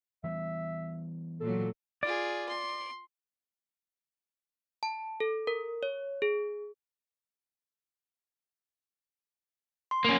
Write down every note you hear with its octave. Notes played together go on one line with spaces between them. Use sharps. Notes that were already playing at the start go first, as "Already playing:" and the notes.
E3 G3 B3 E5
A#2 F#3 A4
F4 G#4 D5
C6
A5
A4
A#4
C#5
G#4
C6
A#3 C#4